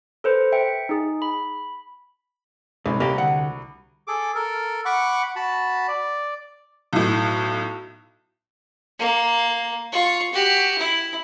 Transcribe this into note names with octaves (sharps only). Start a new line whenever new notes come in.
A4 B4 C5
E5 G5 C#7
D#4 G#4
B5
C2 G#2
C2 A#3 G4
D2 F#5
G#4 A4 D6
A4 A#4
F#5 B5 C#6 D6
F#4 A5 B5
D5
B1 A2
A#3
F4 C#6
F#4 G4
E4